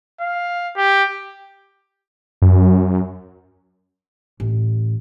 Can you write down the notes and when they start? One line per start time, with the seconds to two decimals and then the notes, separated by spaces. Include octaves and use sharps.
0.20 F5
0.76 G4
2.42 F#2
4.40 A1